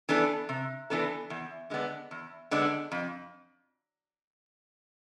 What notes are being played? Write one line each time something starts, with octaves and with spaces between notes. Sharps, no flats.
E3 B3 D4 A4
C3
E3 B3 D4 A4
E2
D3 G#3 B3 D4
E2
D3 G#3 B3 D4
F2